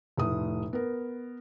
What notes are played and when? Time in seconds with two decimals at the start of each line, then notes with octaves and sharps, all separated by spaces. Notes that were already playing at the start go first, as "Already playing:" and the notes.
0.17 F1 A2 D#6
0.73 B3 A#4